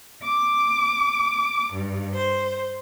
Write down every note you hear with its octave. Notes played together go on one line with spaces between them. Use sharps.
D6
G2
C5